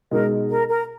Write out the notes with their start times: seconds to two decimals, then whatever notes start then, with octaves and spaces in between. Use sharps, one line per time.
0.11 B2 G#3 D#4 G#4 A#4
0.50 A#4
0.69 A#4